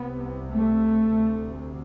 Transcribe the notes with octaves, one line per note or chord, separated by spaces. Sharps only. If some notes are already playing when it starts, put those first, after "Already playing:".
Already playing: C2 C3 B3
A3
D2 C3